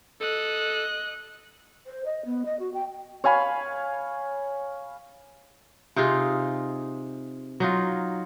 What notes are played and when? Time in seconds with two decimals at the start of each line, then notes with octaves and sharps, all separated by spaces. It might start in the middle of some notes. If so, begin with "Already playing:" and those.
0.21 A4 D#5 F#6
1.86 C5
2.05 D#5
2.25 B3
2.45 D#5
2.59 F#4
2.73 G5
3.24 C#5 F5 G#5 B5
5.96 C3 D#4 F4 G#4
7.60 F#3 D#4 F4